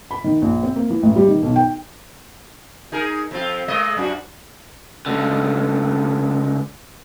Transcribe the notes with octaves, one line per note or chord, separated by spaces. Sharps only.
B5
D#3
A#1
C4
A#3
E3
A1
G3
D#3
B1
G5
D#4 G#4 A#4
F2 C4 F4
G#3 A#3 D#5
F#2 D4 F#4
C#2 D3